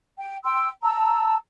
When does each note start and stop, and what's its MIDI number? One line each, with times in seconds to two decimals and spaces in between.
0.17 0.36 79
0.44 0.67 79
0.44 0.67 84
0.44 0.67 88
0.82 1.35 81
0.82 1.35 82
0.82 1.35 88